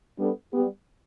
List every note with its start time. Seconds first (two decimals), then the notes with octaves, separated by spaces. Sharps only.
0.17 G3 B3 D4 A4
0.52 G3 B3 G4